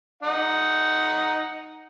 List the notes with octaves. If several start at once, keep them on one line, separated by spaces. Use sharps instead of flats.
D#4 F#5